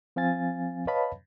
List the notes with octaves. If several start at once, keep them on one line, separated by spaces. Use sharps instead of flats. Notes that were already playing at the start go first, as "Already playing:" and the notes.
F3 C4 F5 G#5 A6
B4 C#5 D#5 F5 A5 B5